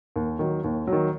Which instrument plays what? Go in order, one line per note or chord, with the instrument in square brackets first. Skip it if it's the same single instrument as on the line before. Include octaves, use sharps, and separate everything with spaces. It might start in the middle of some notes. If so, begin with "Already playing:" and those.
[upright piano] D#2
D#3 F#3
D#2
D#3 F#3